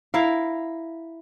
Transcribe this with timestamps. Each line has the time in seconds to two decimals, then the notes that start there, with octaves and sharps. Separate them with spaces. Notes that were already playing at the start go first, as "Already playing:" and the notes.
0.14 E4 A#4 F5